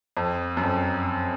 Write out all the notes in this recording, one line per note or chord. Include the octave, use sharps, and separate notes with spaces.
F2
F#2
F2